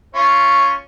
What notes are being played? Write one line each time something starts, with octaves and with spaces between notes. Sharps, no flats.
C#4 F4 C#6